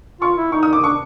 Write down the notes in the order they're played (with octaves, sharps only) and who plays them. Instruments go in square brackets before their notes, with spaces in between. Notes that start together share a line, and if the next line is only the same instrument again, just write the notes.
[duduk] F4 [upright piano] C#6
[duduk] E4
[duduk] D#4 [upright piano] C#6
[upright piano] D#6
D6
[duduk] D4 [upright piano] C#6